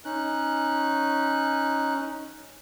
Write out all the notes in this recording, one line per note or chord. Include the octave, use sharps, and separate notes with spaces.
C#4 D#4 F#6